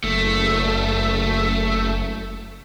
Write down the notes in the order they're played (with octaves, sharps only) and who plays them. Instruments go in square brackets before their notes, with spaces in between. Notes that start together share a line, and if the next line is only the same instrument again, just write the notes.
[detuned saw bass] F#1 [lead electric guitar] A3